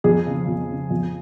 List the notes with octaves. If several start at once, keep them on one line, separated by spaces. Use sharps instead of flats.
F2 G#4
C#3
F2
C#3
F2